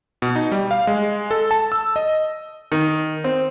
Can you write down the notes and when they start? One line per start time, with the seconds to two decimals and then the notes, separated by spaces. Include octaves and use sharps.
0.22 B2
0.36 D#4
0.52 G3
0.71 F5
0.87 G#3
1.31 A4
1.51 A5
1.72 E6
1.96 D#5
2.72 D#3
3.24 C4